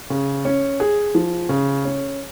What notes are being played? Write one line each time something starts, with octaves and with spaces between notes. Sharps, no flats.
C#3
C#4
G#4
F3
C#3
C#4